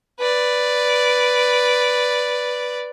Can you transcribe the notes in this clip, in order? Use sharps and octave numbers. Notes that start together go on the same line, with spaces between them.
B4 D5